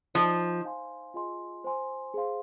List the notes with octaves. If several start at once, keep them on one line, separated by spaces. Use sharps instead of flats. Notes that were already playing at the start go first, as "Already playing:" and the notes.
F3 D#4 C5 D#5 C6
C5 F5 G#5 C6
F4 G#4 D#5 G#5 C6
C5 G#5 C6
G#4 C5 F5 C6